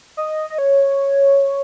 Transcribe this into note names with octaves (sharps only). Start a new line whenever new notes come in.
D#5
D#5
C#5